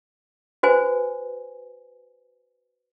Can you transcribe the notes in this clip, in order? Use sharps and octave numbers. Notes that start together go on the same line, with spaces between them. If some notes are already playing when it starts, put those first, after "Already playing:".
F#4 B4 C5 G#5